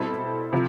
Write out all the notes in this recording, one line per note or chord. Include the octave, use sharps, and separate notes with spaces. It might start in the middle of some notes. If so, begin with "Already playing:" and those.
Already playing: B2 G3 C4 E4 A4
C3 F3